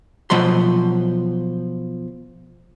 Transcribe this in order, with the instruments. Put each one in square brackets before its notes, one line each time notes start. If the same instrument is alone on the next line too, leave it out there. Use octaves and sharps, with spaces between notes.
[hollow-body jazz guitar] B2 F3 F#3 B5 C6